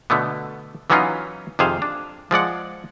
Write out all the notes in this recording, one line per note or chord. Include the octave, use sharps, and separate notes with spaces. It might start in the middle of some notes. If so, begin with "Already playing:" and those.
B2 D3 A3 B3
E3 F#3 B3 C#4 D#4 F4
F2 C3 D#3 G#4 C5 F5
D4
F3 G#3 D5 F#5